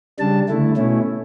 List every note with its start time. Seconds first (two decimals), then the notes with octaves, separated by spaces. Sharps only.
0.19 C#3 G3 D4 A5
0.48 D3 A3 E4
0.77 B2 A3 C#4 E4